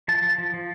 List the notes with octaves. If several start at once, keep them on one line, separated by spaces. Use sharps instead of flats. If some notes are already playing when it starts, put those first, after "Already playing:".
F3 A5
F3
F3
F3